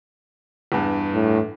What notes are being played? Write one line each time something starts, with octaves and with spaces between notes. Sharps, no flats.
E2 G2
A2